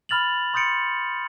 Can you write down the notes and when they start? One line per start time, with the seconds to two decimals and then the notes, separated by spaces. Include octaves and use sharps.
0.09 B5 F6 A6 F7 F#7
0.54 C6 D#6 G6 A6 C#7 D7